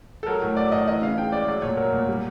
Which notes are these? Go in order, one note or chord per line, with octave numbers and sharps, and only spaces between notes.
A4
F#3 A#4
A2
F#3 D5
A2 D#5
E3 D#5
C#3 F5
C#3 G5
G#3 D5
F#3 D5
A#2 C#5
F#3 A#4
A#2
G3